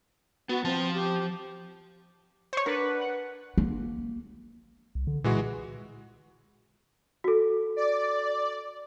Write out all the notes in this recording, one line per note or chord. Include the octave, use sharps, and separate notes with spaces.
B3 F#4
F3 C4 A5
G4
C5 C#5 C#6
D4 A#4 B4 F#5
F#5
A#3
C2
D3
A#2 E3 G#3 F#4
F#4 A4
D5